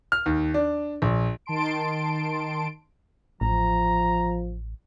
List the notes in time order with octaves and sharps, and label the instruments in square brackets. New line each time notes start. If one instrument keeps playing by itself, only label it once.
[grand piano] F6
D#2
D4
A#1
[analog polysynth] D#3 A5 C6 D7
[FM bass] A1 [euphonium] F3 [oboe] A#5